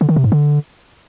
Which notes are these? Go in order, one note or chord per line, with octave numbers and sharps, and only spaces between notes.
D3
D#3
C3
G#2
D3